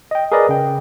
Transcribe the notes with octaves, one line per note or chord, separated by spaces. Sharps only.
D#5 G5
G#4 A#4 B4 D5 D#5
C#3 G5